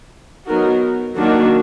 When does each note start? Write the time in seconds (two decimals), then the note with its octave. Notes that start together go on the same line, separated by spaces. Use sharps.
0.47 F#3 B3 D#4 F#4 A#4
1.17 D#3 F#3 A#3 D4 F#4